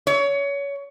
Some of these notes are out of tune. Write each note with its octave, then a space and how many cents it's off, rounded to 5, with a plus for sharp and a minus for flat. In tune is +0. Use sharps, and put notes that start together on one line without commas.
C#5 +25